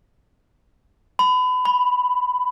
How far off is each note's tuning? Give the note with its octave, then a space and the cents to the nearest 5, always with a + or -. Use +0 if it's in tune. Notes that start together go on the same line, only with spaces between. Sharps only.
B5 +30
B5 +0